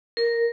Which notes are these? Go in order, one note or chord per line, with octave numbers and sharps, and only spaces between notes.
A#4